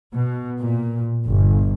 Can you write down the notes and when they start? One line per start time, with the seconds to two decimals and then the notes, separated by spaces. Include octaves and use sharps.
0.13 B2
0.59 A#2
1.25 G1